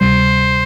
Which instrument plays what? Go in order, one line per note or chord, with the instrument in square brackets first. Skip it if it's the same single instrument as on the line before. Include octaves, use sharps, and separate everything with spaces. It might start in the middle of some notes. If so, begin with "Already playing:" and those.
[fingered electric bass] D2 C3 G3 [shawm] C5